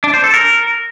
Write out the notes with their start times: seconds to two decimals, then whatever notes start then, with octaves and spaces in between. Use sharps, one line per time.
0.04 D4
0.14 C5
0.24 A4
0.34 A#4